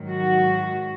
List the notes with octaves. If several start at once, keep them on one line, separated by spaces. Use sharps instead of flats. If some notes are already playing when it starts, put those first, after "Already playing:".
Already playing: G#2 D#3 F#3
F#4